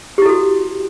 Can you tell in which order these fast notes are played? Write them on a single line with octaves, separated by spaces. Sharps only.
G4 E4 A4 F#4